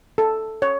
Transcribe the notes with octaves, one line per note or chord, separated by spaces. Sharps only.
A4
C#5